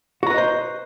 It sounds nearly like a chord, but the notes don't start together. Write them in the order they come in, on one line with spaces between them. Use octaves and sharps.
F#4 A#5 B4 D#5 C5